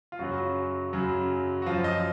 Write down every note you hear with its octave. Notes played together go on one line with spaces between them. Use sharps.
F4
F#2 C#3 F#3 F#4
F#2 C#3 F#3
F#4
F#2 F3 F4
D#5